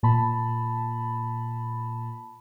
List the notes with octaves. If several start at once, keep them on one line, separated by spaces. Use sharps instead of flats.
A#2 A5 B5